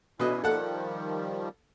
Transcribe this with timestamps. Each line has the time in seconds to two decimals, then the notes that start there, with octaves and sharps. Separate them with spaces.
0.20 B2 C#4 D4 E4 B4 D#5
0.44 D#3 F3 G3 A4 F#5